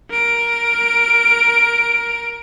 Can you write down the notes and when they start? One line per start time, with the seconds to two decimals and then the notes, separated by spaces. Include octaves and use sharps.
0.10 A#4 D7